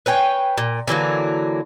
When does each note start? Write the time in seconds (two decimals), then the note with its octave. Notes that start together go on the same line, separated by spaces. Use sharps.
0.06 B4 C#5 G5 G#5
0.58 A#2
0.87 D3 E3 F#3 A#3